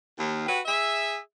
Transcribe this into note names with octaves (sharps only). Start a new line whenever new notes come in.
D#2
F#4 G4 B4
G#4 E5